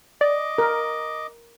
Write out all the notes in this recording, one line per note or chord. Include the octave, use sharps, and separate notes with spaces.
D5 D#5 D6
A#4